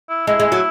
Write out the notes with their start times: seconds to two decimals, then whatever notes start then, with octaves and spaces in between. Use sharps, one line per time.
0.09 E4
0.27 G#3 E4
0.40 G#3
0.52 F#3